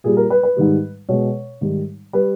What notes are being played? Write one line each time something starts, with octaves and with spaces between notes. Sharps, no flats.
A#2 G3 G#4
A#4
B4
B4
G#2 D#3 G3
B2 G#3 C#5
G#2 D#3 G3
G3 B4